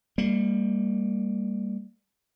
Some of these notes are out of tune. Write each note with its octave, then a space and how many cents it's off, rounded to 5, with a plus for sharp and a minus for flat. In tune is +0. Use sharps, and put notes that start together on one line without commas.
G3 +20 A#3 -20